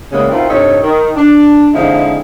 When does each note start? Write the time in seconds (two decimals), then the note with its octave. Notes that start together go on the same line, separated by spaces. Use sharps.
0.12 C#3 E3 G3 G#3 A#3 B3
0.30 B2 D#3 C4 E4 F4
0.49 G2 C3 D#4 A4 C#5
0.83 D#3
1.16 D4
1.74 D3 F3 G#3 C4 D#4 E4